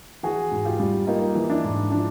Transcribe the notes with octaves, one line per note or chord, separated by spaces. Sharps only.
E3 F#4 G#4
G#2
F4 G4
G3
A#3 D#4 F4
E3
D4 E4
G#2
F3 D4